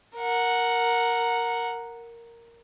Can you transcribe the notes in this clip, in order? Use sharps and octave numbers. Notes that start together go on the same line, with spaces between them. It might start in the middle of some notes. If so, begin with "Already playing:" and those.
A#4 F#5